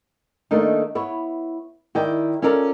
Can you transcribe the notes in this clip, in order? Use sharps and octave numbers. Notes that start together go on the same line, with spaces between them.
D#3 A3 A#3 D4 D#4
B3 E4 C#5
D#3 E4 D5 G5
C#4 F4 A4 A#4 D5